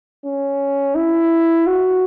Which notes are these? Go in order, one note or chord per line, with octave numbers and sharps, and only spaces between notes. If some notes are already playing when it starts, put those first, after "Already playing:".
C#4
E4
F#4